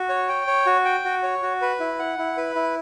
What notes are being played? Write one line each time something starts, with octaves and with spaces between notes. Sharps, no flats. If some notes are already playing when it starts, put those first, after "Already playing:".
Already playing: F#4
C#5
G5
C#5
F#4
G5
F#4
C#5
F#4
B4
E4
F#5
E4
B4
E4